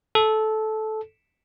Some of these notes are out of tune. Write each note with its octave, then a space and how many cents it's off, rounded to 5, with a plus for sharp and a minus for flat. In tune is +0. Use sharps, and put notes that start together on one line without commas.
A4 -15